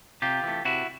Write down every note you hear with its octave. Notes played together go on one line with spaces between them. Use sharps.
C3 F4 G4
E3 A3
C3 E4 F#4